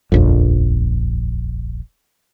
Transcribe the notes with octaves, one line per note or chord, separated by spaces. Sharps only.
D#1 A#1 F2